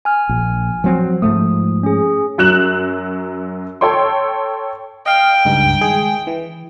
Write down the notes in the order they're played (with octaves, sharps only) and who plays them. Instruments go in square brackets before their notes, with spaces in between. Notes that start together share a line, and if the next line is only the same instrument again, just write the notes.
[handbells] G#5 F6
[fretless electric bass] A#1
F3 F#3 C4
[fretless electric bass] G#2 F3 A3 [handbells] D#6
[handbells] C#4 G#4
[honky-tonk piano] F#2 F#3 F#6 E7 F#7
A4 C#5 G5 C6
[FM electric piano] D#5 F5 [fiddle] G5
[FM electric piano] C#2 G2 D#4
D#3 G#3 G#4
E3